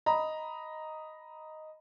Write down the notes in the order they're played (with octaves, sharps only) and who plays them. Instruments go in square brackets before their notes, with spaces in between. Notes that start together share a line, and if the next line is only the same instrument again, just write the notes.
[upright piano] D#5 A#5 B5